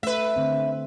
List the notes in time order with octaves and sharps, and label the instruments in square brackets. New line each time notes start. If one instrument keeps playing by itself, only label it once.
[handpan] A3 [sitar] B4 E5
[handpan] D3 C4